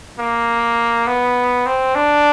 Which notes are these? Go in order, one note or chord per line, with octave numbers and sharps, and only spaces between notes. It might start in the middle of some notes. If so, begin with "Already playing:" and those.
A#3
B3
C4
D4